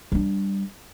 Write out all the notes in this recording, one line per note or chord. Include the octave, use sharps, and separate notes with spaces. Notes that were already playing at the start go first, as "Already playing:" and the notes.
G3 D4